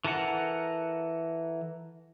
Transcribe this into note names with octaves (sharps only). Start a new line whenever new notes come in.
E3 A4 A#4 F#5